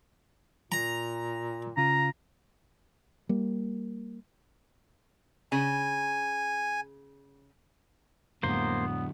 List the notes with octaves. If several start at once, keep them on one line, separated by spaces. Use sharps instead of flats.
A#2 A#5
C#3 F4 A#5
G3 A#3
C#3 G#5
F2 A2 D3 F#3 G#3 A#3 B3 C5